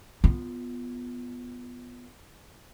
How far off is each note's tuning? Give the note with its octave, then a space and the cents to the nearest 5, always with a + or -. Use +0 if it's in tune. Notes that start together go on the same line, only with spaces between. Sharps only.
B3 +0 F4 +0